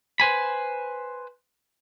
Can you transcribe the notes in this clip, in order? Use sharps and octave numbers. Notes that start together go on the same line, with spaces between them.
B4 C5 G#5 B5